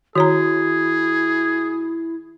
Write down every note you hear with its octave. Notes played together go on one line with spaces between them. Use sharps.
D#3 E4 F#4 G#4 C#5 A#5